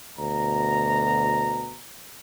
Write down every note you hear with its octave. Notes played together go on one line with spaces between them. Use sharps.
D2 B2 A#5